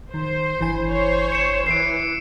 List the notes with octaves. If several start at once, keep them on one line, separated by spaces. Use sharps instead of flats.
D#3 C5
G1 E3 G#5
C5 C#5
C#7 E7
E3 C7 D7